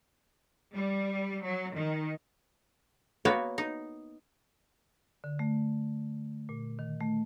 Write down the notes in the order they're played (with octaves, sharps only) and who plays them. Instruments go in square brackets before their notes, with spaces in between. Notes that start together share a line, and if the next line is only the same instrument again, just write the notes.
[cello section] G3
F#3
D#3
[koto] A#3 B3 F#4 B4 C#5
D#4
[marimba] D3
A3
A#2
D#3
A3